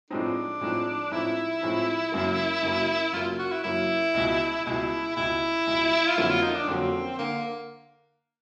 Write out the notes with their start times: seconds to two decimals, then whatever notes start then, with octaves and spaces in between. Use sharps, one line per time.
0.10 A2 F3 G#3 C4 D4 D#4
0.61 A2 F3 G#3 C4 D#4
1.11 A2 F3 G#3 C4 D#4 E4
1.61 A2 F3 G#3 C4 D#4
2.12 F#2 C#3 F#3 A#3
2.62 F#2 C#3 F#3 A#3
3.13 F#2 C#3 F#3 A#3 F4
3.39 F#4
3.52 E4
3.64 F#2 C#3 F#3 A#3 E4
4.14 C#2 B2 G#3
4.66 C#2 B2 G#3 E4
5.17 C#2 B2 G#3 E4
5.67 C#2 B2 G#3
6.07 F4
6.17 F2 D3 F#3 A#3 C#4 E4
6.30 F4
6.42 D#4
6.55 D4
6.68 F2 D3 F#3 A#3 C4 C#4
7.19 D3 A#3